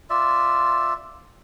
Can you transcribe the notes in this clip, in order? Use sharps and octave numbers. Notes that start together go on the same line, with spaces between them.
F4 D5 E5